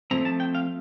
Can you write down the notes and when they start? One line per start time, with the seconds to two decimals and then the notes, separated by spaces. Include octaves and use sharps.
0.11 F3 A3 C4 A#5
0.25 A5
0.40 G5
0.55 F5